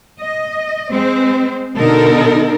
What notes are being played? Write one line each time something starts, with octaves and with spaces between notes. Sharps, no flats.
D#5
G#3 C4 C5
B2 D3 D#4 A4 A#4